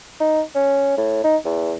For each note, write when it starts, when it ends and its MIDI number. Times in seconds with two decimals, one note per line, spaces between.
0.20 0.41 63
0.55 0.95 61
0.98 1.22 45
1.24 1.37 63
1.45 1.74 40